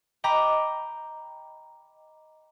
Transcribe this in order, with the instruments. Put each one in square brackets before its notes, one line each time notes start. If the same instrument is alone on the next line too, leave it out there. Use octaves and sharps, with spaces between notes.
[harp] D#5 G5 A#5 B5 D6 A#6